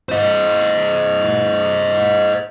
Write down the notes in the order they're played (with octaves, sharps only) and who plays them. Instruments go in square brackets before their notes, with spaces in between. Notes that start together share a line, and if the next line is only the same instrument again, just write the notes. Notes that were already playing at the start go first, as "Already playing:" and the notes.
[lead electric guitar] C5 D#5